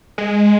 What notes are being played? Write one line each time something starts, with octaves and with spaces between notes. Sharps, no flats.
G#3